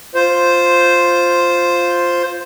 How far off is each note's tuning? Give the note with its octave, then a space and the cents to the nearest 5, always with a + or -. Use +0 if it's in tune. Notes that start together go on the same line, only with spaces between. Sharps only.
F4 +0 C5 +0